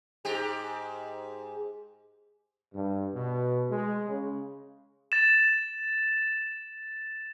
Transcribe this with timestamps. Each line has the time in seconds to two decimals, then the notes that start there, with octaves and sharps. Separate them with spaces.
0.25 G#2 G4
2.73 G2
3.14 B2
3.70 G#3
4.08 C#3
5.12 A6 E7